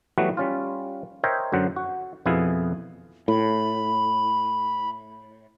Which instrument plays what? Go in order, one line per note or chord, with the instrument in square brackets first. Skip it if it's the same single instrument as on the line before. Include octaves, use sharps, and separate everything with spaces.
[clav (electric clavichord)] E3 F#3 G3 A3 B3 F#4
G3 C#4 F4
A#4 C5 C#5 D#5 E5 G5
F#2 D3 F#3 C5 F#5
F#4
F2 B2 B3 E4 G#4 F5
[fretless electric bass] A2 [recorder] B5